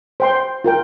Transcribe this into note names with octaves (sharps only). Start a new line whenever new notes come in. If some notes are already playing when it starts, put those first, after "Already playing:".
C5 G5 C6
F4 A#4 G5